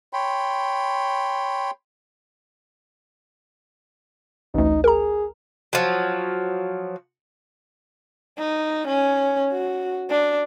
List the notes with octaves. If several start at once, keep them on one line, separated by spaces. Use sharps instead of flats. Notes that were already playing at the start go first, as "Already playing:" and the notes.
C#5 G5 B5 C6
A1 D2 D#4
G#4 A#4 A#5
F3 F#3
D#4
C#4
F#4
D4